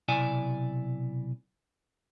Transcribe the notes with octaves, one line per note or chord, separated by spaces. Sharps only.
B1 C3 E4 D5 G#5